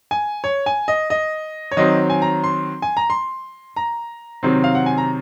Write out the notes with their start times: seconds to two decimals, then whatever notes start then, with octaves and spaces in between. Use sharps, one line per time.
0.11 G#5
0.44 C#5
0.66 G#5
0.88 D#5
1.10 D#5
1.71 C#5
1.77 D#3 F#3 C4 D#5
2.10 G#5
2.22 A#5
2.44 C6
2.82 G#5
2.97 A#5
3.10 C6
3.76 A#5
4.43 C3 D#3 F#3 C4
4.64 F5
4.75 F#5
4.86 G#5
4.98 A#5